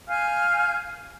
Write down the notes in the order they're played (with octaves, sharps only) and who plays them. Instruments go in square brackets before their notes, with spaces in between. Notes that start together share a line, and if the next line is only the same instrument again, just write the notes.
[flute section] F5 G#5 F6 G6